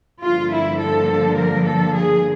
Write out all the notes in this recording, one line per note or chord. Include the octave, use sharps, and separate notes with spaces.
G2 D3 F3 A#3 F4
E4
A4
A#4
A4
G#4